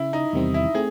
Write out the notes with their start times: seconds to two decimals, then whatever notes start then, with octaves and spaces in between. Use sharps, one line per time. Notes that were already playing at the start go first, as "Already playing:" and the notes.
Already playing: C#3 E4
0.13 D#4
0.33 E2 C3 D#3 G3 C4
0.54 E4
0.74 A3 C4 G#4